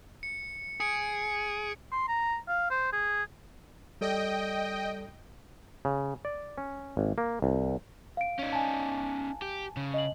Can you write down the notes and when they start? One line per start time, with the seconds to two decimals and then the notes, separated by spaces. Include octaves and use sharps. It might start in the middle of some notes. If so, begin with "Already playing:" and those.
0.23 C#7
0.80 G#4 C#7 D7
1.92 C6
2.08 A#5
2.48 F5
2.70 C5
2.93 G#4
4.01 G3 A4 D5 D#5 G5
5.85 C#3
6.25 D5
6.58 C#4
6.97 G#1
7.18 A#3
7.42 C2
8.17 F5 D7
8.39 C#4 D#4
8.53 G#5 A5
9.42 G4
9.77 C#3
9.94 D#5 F#7